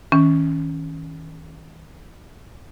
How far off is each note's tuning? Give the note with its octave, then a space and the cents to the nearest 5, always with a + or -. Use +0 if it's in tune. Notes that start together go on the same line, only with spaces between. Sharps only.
D#3 +40 C#4 +0